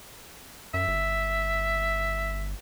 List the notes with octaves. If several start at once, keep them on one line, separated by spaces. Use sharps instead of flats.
F#2 E5
G1